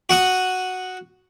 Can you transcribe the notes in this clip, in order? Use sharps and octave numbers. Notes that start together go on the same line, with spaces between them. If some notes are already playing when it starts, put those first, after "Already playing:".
F#4 F#5 D#6